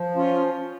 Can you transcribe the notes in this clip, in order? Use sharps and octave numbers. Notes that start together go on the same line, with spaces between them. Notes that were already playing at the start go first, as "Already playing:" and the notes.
Already playing: F3
C#4 F4